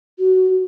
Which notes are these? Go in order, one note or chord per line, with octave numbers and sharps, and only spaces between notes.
F#4